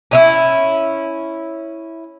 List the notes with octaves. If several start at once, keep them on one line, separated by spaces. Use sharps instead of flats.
C#4 D#4 E4